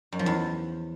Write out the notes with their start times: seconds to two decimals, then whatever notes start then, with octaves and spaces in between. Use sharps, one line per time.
0.12 F#2
0.19 F3
0.26 E2